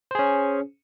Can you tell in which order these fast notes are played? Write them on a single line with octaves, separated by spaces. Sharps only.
C5 G#4 C#4